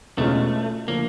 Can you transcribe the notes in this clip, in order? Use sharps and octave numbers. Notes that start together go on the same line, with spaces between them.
E2 B2 G#3 A3 C#4 F4
D3 F3 A3 A#3 D4